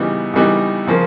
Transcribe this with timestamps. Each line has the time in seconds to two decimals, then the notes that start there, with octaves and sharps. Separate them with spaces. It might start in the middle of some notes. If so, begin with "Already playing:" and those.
Already playing: C#3 E3 G3 B3 D#4
0.34 C#3 E3 G3 B3 D#4
0.87 C#3 F3 A#3